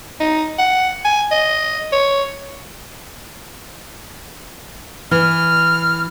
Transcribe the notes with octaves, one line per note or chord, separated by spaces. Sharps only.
D#4
F#5
G#5
D#5
C#5
E3 F6